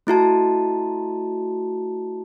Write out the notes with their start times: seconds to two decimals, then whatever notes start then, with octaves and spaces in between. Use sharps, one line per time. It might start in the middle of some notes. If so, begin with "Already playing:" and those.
0.07 A3 E4 F#4 A5